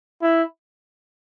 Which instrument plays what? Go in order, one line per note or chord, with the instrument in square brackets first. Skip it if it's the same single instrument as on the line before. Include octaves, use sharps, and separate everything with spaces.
[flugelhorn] E4